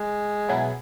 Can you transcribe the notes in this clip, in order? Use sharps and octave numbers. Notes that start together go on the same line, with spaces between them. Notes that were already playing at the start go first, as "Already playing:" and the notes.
Already playing: G#3
B2 F#3 B3 E4 G#4